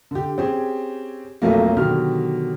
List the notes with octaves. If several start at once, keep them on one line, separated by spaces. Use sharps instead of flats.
D3 G4
C4 C#4 G4 G#4
B1 F2 F#3 A3 A#3
B2 D3 D#3 F#3 G4 F6